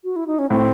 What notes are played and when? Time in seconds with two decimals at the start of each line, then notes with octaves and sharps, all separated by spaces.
0.04 F#4
0.16 E4
0.27 D#4
0.39 C#4
0.49 A2 C4